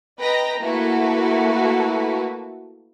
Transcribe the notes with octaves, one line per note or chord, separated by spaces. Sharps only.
B4 D#5 G5 A#5 A#6
A3 A#3 E4 F#4 A4 B4